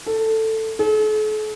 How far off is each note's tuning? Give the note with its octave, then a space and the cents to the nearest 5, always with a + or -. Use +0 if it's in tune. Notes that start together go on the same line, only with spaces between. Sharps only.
A4 +10
A4 -45